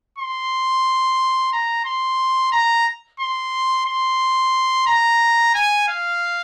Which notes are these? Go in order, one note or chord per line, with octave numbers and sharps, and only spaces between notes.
C6
A#5
C6
A#5
C6
C6
A#5
G#5
F5